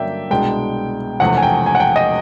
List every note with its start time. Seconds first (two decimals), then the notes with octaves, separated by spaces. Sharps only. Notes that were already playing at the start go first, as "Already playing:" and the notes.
Already playing: G2 D3 F#3 A#3 C#4 D5 E5 G5
0.31 C2 B2 G#3 B3 D4 G5
1.20 E1 E2 C3 F3 A3 F#5
1.37 G#5
1.43 G5
1.66 G#5
1.75 F#5
1.80 G5
1.96 D#5